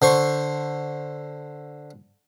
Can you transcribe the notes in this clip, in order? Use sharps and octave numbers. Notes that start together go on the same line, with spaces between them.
D3 C5 C#6